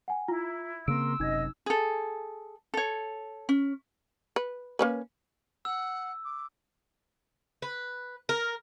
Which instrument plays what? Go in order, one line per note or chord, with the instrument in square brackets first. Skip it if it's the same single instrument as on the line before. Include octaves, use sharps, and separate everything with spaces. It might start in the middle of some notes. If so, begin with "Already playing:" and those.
[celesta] F#5 G#5
[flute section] E4 [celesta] F4 A#5
[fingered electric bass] C#3 A#3 C4 [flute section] A#4 C6 [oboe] E6 [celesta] D7
[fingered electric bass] F#1 F#2 C3 [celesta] D#4 G#6 [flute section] D#5
[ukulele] G#4 A4
A4 C#5
C#4
[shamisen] B4
A#3 C#4 B4
[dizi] F#5 [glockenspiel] E6
[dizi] D6
[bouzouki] B4
A#4